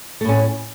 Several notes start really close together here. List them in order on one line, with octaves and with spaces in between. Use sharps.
A3 A2 C#4